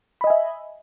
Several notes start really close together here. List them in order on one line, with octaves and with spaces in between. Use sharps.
B5 D#5 G#5 E5